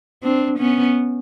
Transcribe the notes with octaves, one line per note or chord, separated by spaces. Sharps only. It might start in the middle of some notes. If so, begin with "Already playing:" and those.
C4 D4
B3 C#4